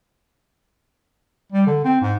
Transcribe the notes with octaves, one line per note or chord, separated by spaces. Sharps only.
G3
D3
C4
G#2